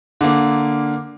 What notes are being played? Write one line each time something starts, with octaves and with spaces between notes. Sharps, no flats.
D3 A#3